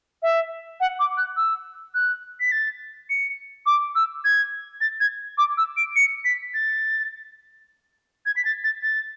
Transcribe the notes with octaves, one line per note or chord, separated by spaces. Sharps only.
E5
F#5
D6
F#6
E6
F#6
B6
A6
C#7
D6
E6
G#6
A6
G#6
D6
E6
D7
C#7
B6
A6
G#6
B6
A6
A6
A6